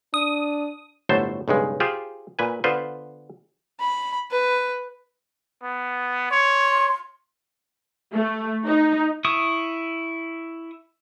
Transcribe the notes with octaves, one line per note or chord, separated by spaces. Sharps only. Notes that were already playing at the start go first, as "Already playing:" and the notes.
D4 D#6
G1 A2 F#3 A3 C5 A5
B1 G2 C#3 G#3
F4 G4 G#4 C5
A#2 B4 G#5
D3 B3 F4 B4 C5
B5
B4
B3
C#5 C6
A3
D#4
E4 C#6 D#6